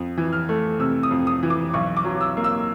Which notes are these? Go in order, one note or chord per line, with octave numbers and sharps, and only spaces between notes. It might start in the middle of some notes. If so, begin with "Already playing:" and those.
Already playing: F2
E3
F6
A3
C3 E6
D#6
F2
D#6
E3
D6
B1 C#6
D6
F#3
E6
A#3
E6